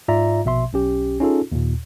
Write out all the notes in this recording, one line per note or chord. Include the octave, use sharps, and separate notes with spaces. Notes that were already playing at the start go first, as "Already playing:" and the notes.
G#2 F4 D5 E5 A#5
A#1 B2 E5 C6
B1 C#4 G4
C#4 D#4 F4 G#4 A4
D#2 A#2